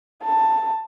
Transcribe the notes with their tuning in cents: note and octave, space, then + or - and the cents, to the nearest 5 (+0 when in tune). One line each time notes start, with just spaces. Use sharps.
A5 +10